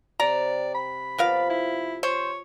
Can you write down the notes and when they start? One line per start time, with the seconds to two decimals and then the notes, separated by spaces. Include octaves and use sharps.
0.20 C3 G3 D5 A#5
0.74 B5
1.18 F3 B3 F4 A#4 D5 F5
1.50 E4
2.03 C5 C#5